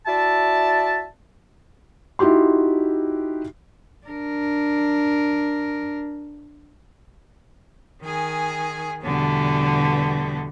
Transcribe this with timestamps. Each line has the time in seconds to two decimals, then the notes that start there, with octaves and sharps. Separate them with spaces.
0.07 E4 F#4 D5 E5 A5
2.19 D#4 E4 F#4 G4 C6
4.07 D4 A#4
8.03 D#3 G#4 G#5
9.04 E2 B2 D3 G3 A3 B3